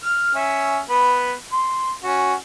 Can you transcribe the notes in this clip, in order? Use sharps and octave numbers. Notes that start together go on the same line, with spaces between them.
F6
C#4 E5
B3 B5
C6
C#4 F#4